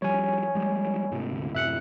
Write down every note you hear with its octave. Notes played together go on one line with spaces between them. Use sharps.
F3 G3 C#5 G#5
F3 G3 G#3
G#2 C3 A3
D2
F#2 A2 C3 E5 F#6 C#7